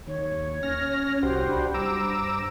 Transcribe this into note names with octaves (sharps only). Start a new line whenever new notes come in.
D#2 C#5
C#4 F6 A#6
C2 F#4 G4 C5
D4 B5
G2 C5 A#5 D6 E6